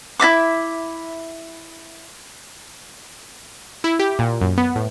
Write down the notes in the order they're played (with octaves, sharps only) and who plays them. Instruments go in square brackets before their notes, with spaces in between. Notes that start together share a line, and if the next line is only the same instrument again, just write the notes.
[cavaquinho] E4 D#5 E5 D6
[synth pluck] E4
G4
A#2
F#2
B3
A2